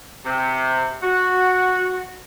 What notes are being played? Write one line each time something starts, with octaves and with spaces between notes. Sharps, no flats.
C3
F#4